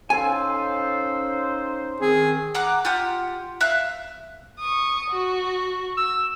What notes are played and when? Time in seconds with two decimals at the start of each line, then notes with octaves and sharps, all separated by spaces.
0.10 C#4 D#4 A4 C5 F5 G#5
2.00 D#3 C4 G#4
2.55 F#5 A#5 D6 F#6
2.85 F4 G4 F#5
3.61 E5 F5 F#6
4.59 C#6 D#6
5.11 F#4
5.97 E6